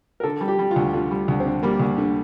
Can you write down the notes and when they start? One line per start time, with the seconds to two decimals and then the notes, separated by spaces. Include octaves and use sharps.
0.20 A#4
0.23 D3 A4
0.41 G3
0.48 G4
0.59 G3
0.71 F4
0.76 D2
0.93 D3 F4
1.11 G3
1.28 D2
1.40 C4
1.46 D3
1.63 G3 A#3
1.79 D2
1.98 D3